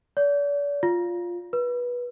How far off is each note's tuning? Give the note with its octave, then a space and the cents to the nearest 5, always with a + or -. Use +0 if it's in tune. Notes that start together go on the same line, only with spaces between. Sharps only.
D5 -40
F4 +5
B4 -20